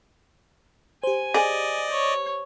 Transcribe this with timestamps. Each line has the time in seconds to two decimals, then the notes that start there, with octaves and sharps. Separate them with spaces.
1.04 G4 C5 G#5
1.34 G#4 D5 D#5
1.90 C#5